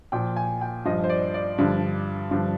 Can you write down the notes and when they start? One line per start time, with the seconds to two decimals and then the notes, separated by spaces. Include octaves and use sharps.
0.12 A#2 F3 G5
0.36 G#5
0.61 G5
0.85 G2 F3 D#5
1.04 C5
1.09 D5
1.34 D5
1.58 G2 D3 F3
2.31 G2 D3 F3